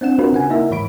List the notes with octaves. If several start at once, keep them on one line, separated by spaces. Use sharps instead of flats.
C4 D4 F#5 E7
C4 D4 F4 F#4 A#4 B4
C#3 F#5 G#5
A#3 D#4 E4 A#4 E5
G#2 E3 C#5 B5 D7